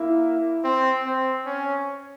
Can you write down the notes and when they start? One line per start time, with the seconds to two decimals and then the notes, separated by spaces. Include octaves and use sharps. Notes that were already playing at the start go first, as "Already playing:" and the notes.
Already playing: A#3 E4 E5
0.64 C4
1.06 C4
1.46 C#4